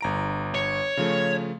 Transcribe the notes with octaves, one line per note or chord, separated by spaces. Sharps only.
G1 A#5 D7
C#5
C#3 F3 A3